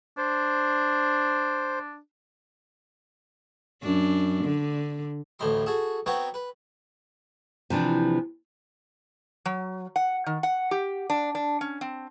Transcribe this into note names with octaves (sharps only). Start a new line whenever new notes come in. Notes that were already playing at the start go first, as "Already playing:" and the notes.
D4 C5
F#2 D4
D3
A1 D2 A2 D#5 B5 C6
F#4 G#4 A4
B3 C4 D#4 F#4 B4 C#5
B4
C3 E3 F3 D4
F#3
F#5
D#3
F#5
G4
D4
D4
C#4
C4